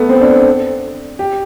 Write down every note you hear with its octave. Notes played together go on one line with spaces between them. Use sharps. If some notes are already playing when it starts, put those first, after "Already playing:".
Already playing: A3 B3
C4
D4
G4